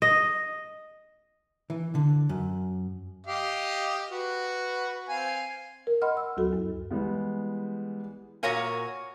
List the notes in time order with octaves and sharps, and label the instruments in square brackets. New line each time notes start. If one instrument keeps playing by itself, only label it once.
[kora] D#5
[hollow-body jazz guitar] E3
D3
F#2
[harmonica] G4 D#5 F5
F#4 B4
C4 F5 G#5
[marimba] A#4
D#5 F#5 B5 C6 F6
E6
D2 F#3 F#4 A4
F#2
[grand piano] E3 G3 G#3 B3
[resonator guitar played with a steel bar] A#2 F#4 A#4 C#5 F5 G#5